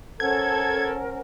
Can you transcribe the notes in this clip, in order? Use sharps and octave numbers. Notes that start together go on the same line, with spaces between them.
C#4 A4 A#4 C5 F#5 G#5 G#6